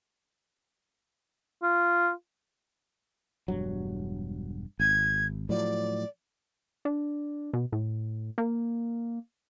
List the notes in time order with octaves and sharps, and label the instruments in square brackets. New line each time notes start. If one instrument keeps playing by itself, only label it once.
[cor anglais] F4
[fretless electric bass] E1 G2 F#3
[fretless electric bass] G#1 [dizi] G#6
[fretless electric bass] A2 F3 F#3 [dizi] D5
[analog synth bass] D4
B2
A2
A#3